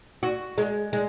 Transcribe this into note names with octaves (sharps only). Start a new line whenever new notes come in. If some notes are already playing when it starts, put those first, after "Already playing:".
F#4
G#3
G#3